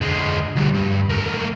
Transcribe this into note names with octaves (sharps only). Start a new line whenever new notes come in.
D3 G#3
D2 G3
G2
A3 A#3